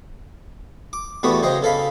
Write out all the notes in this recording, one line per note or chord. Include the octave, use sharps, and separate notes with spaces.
D6
E2 G3 A3 B3 F#4 B5
C#3 F#3 C5 D#5 G5
C#3 A4 F5 B5